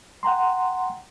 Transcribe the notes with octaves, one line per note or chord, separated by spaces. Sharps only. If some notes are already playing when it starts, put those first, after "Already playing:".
F#5 G5 A#5 C6